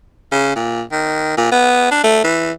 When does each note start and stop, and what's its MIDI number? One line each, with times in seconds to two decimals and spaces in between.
0.32 0.52 49
0.56 0.83 46
0.92 1.35 51
1.37 1.50 46
1.52 1.90 59
1.91 2.02 62
2.04 2.23 57
2.24 2.52 52